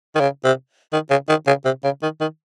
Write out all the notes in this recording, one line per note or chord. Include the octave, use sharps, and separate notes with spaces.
D#3
C#3
C3
D#3
C#3
D#3
C#3
C3
C#3
D#3
D#3